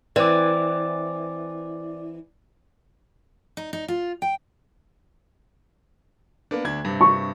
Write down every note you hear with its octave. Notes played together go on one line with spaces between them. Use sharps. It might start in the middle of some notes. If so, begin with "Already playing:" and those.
E3 C4 D5 D6
D#4
D#4
F4
G5
A#3 B3 D4
D2 D4 G#6
G2 C3
C#6